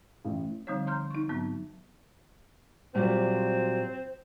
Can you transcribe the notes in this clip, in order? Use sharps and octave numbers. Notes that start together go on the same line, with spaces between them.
A1
D3 F3 G3 C4 D#4 C#5
A#5 C6 F6 G6
D#4 C#6
G#2 F#3 B3 C4 D#4
A#2 F#3 G3 C4